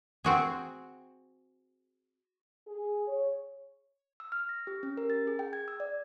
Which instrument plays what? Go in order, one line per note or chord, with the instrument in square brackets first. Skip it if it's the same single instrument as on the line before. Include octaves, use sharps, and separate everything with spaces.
[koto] C4 F#4 G#4
[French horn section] G#4
C#5
[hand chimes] E6
F6
A#6
G4
C#4
A#4
A6
G#4
G5
G#6
E6
D5